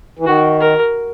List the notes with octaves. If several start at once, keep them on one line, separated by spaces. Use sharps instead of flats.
E3
D#3 F#4
A#4